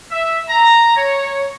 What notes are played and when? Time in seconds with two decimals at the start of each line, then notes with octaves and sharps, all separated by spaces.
0.11 E5
0.49 A#5
0.97 C#5